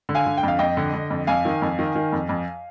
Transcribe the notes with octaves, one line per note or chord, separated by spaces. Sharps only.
D3
F5 G#5
D3
G5
F2 F5
F2 D#5 G5
D3
D3
F2
F2 F5 G#5
D#3
F2
D#3
D#3
F2
F2